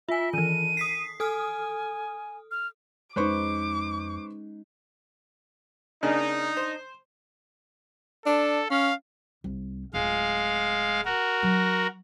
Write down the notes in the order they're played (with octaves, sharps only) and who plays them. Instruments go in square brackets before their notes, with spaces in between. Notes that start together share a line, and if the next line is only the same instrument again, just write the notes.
[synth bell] F4 G#5 [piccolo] E5
[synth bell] D#3 E3 [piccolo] D#7
[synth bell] D#6 B6 C7
[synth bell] A4 D#6 F6 [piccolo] G#5
[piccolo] F6
[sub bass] F2 [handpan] G#3 C#4 D#4 [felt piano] B4 C5 C#6 [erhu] D6
[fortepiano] C#3 A#3 G#4 [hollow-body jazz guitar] D4 [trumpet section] D#4
[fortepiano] C5
[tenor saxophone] D4 [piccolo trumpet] A4
[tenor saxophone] C#4 [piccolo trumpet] F5
[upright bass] C2
[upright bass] D1 F4 [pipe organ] G#3 F5
[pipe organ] F#4 A#4
[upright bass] F#3